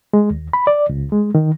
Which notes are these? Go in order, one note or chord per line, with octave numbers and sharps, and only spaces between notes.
G#3
D#2
B5
D5
C#2
G#3
D#3